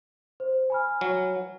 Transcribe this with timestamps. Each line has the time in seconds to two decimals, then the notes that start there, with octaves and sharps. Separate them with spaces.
0.40 C5
0.70 G#5 B5 F6
1.01 F#3